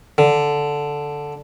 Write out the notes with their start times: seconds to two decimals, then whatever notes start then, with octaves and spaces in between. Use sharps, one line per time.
0.18 D3